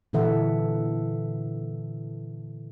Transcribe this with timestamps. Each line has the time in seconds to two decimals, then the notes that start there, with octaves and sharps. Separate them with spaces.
0.13 A#2 D3 E3 A4 E5 F#5